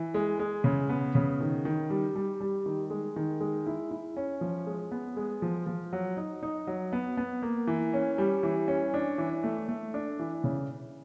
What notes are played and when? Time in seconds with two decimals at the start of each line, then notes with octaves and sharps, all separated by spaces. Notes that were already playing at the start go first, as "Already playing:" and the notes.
Already playing: E3
0.14 G#3
0.39 G#3
0.64 C#3
0.89 B3
1.15 C#3
1.41 D#3
1.65 D#3
1.90 G3
2.16 G3
2.41 G3
2.66 D#3
2.90 G#3
3.16 D#3
3.40 G#3
3.66 E4
3.91 E4
4.17 C#4
4.41 F3
4.67 G#3
4.92 B3
5.17 G#3
5.42 F3
5.67 F3
5.93 F#3
6.17 D#4
6.43 D#4
6.67 F#3
6.93 B3
7.17 B3
7.42 A#3
7.67 E3
7.94 C#4
8.18 G3
8.43 E3
8.68 C#4
8.94 D4
9.18 E3
9.44 A3
9.69 A3
9.94 D4
10.19 E3
10.44 C#3